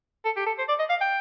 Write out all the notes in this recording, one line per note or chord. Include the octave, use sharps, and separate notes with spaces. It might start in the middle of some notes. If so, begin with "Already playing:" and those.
A4
G4
A4
C5
D5
D#5
F5
G5